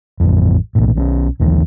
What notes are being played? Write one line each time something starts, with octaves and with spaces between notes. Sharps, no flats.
A1 F2
B1 A2
B1 F3 C#4
A#1 D#2 D#3 E3